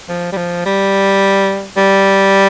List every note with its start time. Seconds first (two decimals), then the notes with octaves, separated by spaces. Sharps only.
0.09 F3
0.32 G3
0.37 F3
0.66 G3
1.77 G3